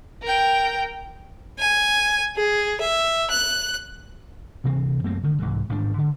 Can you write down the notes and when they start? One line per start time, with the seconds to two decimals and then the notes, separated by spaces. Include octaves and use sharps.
0.23 A#4 G5
1.58 G#5
2.36 G#4
2.80 E5
3.30 F#6
4.64 D2 C3 E3 C4
5.04 F#2 A3 A#3 C4
5.23 D3 D#3
5.39 C2 G#2 E3
5.69 A1 G#2 D#3 D4
5.98 D3